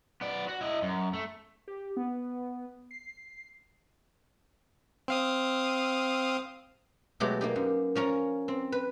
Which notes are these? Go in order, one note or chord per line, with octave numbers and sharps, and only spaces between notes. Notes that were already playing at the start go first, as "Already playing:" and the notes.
B3 D5
F#4
E4 D#5
F#2
A3
G4
B3
C7
C4 F5 D#6
B2 F#3 G#3 A3 G4
A#3 D#4 G4
F#2
F3 C#4 A#4 A#5
C4
B4